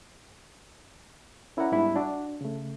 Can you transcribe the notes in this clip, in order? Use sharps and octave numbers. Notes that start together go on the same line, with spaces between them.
C#4 E4 A#4 D5 F#5 A#5
G#2 G3 B3 D4 E4
D4 F#4
C#3 A3